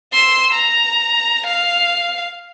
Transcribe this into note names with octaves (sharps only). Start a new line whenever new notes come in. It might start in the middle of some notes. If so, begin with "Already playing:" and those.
C6 E6
A#5
F5